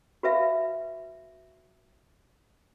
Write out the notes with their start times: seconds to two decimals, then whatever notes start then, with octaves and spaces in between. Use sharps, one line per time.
0.23 F#4 B4 E5 F5